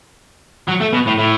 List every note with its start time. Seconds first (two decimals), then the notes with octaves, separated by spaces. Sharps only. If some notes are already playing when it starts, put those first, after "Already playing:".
0.68 F#3
0.80 A3
0.93 B2
1.06 A2
1.18 A2